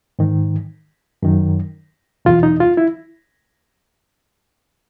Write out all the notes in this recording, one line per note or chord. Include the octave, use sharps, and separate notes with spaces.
G#2 D#3
F#2 D#3
E2 B2 F4
D#4
F4
E4